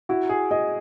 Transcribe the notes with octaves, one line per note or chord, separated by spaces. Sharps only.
E4 F#4
G#4
G#4 D#5